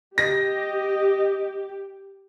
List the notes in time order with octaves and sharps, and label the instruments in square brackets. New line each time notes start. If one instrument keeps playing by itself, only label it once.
[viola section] G4 [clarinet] D#5 [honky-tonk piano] A#6